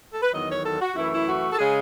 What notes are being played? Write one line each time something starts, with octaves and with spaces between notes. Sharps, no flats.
A4
B4
E2 D#3 F#3 B3 D#5
C#5
A4
F#4
F#2 E3 A3 E4
E4
F#4
A4
C#3 G#3 G#4